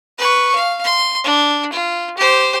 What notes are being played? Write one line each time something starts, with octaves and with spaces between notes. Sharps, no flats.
B4 C#6
F5
C6
D4
F4
G4 C5